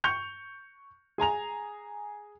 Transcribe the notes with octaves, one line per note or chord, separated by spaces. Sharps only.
C#6 G6 C#7 F7
G#4 G#5 A#5 F7